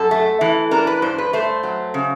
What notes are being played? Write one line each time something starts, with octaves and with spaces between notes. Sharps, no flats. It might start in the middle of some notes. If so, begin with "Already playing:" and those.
Already playing: F#2 A4
A3
E3
D4 A#4
B4
G2 C5
B4
A3 C5
F#3
C#3